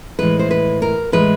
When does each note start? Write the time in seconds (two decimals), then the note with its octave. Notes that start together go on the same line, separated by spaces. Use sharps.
0.19 A2 E3 G#3 B4
0.39 C5
0.51 B4
0.82 A#4
1.12 A2 E3 G#3 B4